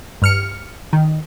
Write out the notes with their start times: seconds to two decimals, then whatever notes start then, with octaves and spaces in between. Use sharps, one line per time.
0.22 G2 F6 C#7
0.93 D#3